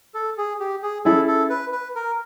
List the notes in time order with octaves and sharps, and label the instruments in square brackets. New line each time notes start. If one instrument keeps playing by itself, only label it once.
[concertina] A4
G#4
G4
G#4
[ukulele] C#4 E4 G#4 [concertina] A4
[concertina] A4
B4
B4
A#4